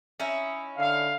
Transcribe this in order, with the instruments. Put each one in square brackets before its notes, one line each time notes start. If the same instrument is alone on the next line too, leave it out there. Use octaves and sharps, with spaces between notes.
[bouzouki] C#4 D#4 E4
[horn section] D3 F5